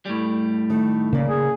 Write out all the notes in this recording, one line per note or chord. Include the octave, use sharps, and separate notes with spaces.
A2 G3
D#3 A3
C#3 A#3 D5
G#4